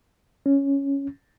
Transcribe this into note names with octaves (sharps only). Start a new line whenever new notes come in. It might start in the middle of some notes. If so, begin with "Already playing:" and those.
C#4